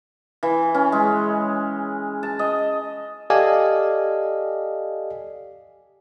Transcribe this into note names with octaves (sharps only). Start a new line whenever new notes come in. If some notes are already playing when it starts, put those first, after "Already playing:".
E3
C#4
G#3
A5
D#5
G4 A4 D5 D#5 F5 G#5